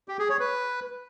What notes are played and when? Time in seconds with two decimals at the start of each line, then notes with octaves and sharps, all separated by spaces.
0.08 G4
0.19 G#4
0.29 C#5
0.40 B4